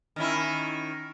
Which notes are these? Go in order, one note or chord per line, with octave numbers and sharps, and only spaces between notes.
D#3 C#4 E4